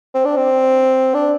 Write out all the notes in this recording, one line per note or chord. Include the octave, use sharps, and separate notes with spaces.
C4
D4
C4
D4